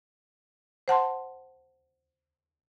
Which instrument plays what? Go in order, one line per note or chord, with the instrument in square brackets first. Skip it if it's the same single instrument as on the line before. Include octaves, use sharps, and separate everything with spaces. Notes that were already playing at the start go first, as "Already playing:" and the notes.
[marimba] C5 F#5 A5 C6